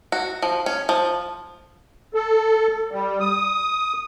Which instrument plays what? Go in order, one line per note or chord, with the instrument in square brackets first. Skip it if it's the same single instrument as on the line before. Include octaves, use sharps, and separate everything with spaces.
[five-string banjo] F#4
F3
C#4
F3
[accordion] A4
G3
D#6